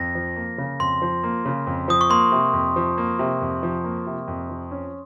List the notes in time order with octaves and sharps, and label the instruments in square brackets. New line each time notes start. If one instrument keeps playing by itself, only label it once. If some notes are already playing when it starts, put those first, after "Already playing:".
Already playing: [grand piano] F2 [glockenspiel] A#6
[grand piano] F3
A#3
C#3
[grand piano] F2 [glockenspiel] C6
[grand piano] F3
A#3
C#3
F2
[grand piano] F3 [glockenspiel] D#6
[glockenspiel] C#6
[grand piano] A#3 [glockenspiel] C6
[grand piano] C3
F2
F3
A#3
C3
F2
F3
A#3
C3
F2
F3
C#4